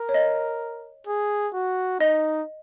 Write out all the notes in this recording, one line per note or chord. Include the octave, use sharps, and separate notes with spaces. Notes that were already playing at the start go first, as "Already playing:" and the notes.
Already playing: A#4
C#5
D#5
G#4
F#4
D#4 D#5